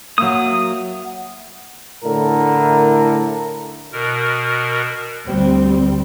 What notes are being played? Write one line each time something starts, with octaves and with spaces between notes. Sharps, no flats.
F#3 A#3 E5 F#5 D#6
A2 D3 A3 E4 A4 A#4
B2 A#4
D2 G3 C4